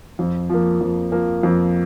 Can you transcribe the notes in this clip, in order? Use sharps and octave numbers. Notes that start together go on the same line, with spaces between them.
F2
F3 A#3
F2
F3 A#3
F2